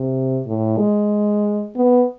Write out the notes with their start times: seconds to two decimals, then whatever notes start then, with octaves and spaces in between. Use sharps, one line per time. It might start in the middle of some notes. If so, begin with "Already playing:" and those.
Already playing: C3
0.47 A2
0.78 G#3
1.76 B3